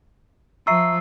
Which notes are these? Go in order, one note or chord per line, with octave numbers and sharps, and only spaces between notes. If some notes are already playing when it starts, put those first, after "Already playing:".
F3 E5 A#5 C#6 E6 C7